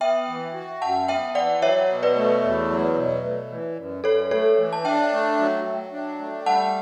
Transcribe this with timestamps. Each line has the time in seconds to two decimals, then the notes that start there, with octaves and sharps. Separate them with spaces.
0.01 B3 E5 G5
0.28 E3
0.54 F#4
0.82 F#2 F#5 A5
1.08 B3 E5 G5
1.35 E3 D5 F#5
1.62 F#3 C#5 E5
1.89 B2
2.03 B4 D5
2.16 A3
2.43 E2
2.70 F#3
2.96 B2
3.24 A3
3.50 E3
3.77 F#2
4.04 F#2 A4 C#5
4.31 A3 A4 C#5
4.57 E3
4.73 A5
4.85 D4 E5 G5
5.12 A3
5.39 F#3
5.65 F#3
5.93 D4
6.19 A3
6.46 G3 F#5 A5